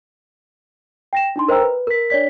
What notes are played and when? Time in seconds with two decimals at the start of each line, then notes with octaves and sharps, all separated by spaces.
1.13 G5 A#6 E7
1.36 D4 D#4 C6
1.48 A#4 C5 D#5 G5 A#5 E6
1.62 B4
1.87 A#4 B6
2.10 D4 C#5 D5 B6